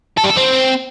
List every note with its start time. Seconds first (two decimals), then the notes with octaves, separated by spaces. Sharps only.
0.18 A4
0.24 G3
0.30 A4
0.37 C4